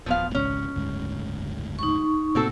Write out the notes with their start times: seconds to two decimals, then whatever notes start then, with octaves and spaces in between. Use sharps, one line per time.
0.06 D1 F3 B3 F5
0.35 G#1 C#2 C#4
0.74 F#1 D2 G#2
1.79 D#4 C#6
2.35 A2 C3 A#3 C4 F#4 A4